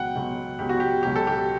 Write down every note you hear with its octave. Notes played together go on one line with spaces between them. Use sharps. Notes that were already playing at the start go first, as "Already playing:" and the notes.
Already playing: C#2 B2 F#3 F#5 G5
C#2 B2 F#3
C#2 B2 F#3 G4
F#4
G4
C#2 B2 F#3 G4
A4
G4